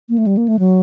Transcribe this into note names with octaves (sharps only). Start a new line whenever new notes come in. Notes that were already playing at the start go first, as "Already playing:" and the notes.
A#3
A3
G3
A#3
A3
F#3